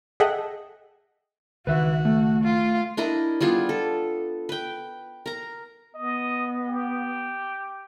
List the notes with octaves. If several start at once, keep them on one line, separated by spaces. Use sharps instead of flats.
G#4 A4 D#5 E5 F#5 G5
C#2 D#3 F#4 B4 E5
A3
F4
D4 E4 A#4 D#5
G3 B3 F4 G#4
A4
B4 G5
A#4 A#5
B3 D#5
G4